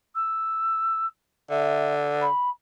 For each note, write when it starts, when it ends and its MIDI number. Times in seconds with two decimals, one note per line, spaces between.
0.15 1.06 88
1.50 2.27 50
1.50 1.94 76
2.21 2.50 83